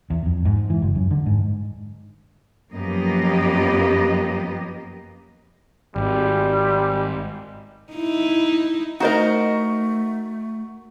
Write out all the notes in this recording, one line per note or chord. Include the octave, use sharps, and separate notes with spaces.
E2
F2
G#2
E3
F#1
F#2
D3
G#2
F#2 F3 A#3 B3 G4 D#5
G#1 G3
D#4 E4
A3 D#4 F#4 A#4 C5 D#5